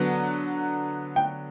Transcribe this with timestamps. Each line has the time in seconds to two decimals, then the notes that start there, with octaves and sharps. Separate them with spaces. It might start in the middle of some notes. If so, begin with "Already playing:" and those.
Already playing: D3 F#3 B3
1.16 G5